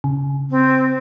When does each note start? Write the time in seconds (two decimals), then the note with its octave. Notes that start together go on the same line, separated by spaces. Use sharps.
0.04 C#3
0.50 C4